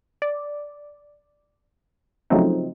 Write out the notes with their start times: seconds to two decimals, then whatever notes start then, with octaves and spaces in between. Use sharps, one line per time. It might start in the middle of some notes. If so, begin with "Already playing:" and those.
0.22 D5
2.30 C#3 F3 F#3 A3 C4 D#4